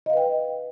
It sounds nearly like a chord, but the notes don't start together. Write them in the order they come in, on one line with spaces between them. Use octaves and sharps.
D#5 F5 B4 G5